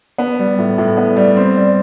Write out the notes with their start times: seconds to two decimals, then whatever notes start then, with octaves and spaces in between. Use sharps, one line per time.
0.18 B3
0.39 G3
0.59 A2
0.78 A2
0.97 B3
1.16 G3
1.37 C4
1.56 G3